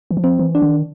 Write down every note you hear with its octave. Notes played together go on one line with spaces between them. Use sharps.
E3
F3
C4
E3
D4
D#3